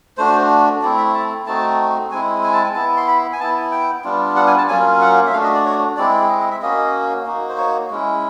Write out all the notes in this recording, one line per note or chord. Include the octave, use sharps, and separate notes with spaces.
A3 D4 F#4 C5
A3 C4 E4 D5
E5
A5
A3 C4 D#4 F#4 A5
G#3 C4 E4 G#5
G#5
A5
G#5
B3 E4 A5
C6
B5
G#5
B3 E4 A5
G5
G3 B3 D4 F4
F#5
G#5
A5
F#3 A#3 C#4 F4 G#5
F#5
E5
A3 D4 F#4 F5
D#5
D5
C#5
G#3 C4 E4 D5
D#5
D#5
E5
A#3 C#4 F#4 D#5
A#3 D#4 F#4
C5
C#5
G#3 C#4 E4